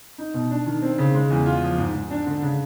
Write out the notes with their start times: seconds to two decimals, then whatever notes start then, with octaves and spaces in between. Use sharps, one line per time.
0.18 D#4
0.34 B2
0.51 D4
0.66 D#3
0.83 C4
0.98 C#3
1.14 G#3
1.30 E2
1.46 F4
1.63 F3
1.78 G#2
1.95 G#2
2.10 D4
2.27 D3
2.42 C#3